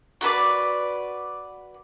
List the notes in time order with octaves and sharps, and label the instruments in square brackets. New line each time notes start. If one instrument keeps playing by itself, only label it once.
[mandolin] F#4 A4 B4 D5